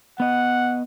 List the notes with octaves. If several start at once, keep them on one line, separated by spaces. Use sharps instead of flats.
B3 D#5 F#5